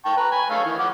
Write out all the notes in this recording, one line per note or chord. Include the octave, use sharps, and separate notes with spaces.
G5 A5 C#6
B4 A#5
G#5 B5
A3 C#5 F5
D#3 E3
F3 F#5 D6